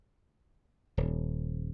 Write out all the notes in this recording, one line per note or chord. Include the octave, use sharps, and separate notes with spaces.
D#1